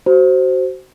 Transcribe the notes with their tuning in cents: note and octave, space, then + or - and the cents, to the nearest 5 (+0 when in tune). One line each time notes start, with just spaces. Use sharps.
F#4 +25 C5 +0